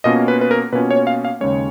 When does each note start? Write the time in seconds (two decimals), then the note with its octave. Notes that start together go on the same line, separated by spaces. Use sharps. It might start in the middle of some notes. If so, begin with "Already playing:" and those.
0.04 B2 A#3 C#4 F4 D#5
0.28 B4
0.41 B4
0.51 A#4
0.73 B2 A#3 C#4 F4 B4
0.91 C#5
1.07 F5
1.25 F5
1.41 D#2 C#3 G#3 C#4 C#5